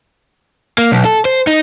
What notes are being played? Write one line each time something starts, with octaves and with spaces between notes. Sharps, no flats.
A#3
B1
A4
C5
D#4